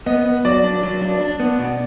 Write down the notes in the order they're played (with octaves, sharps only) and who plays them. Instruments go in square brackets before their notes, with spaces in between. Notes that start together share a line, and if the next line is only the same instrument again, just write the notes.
[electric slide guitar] B3 [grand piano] D#5
[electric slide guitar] B3
[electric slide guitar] F#3 [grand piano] D5
[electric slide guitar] D4
F#3
D4
D4
B3
B2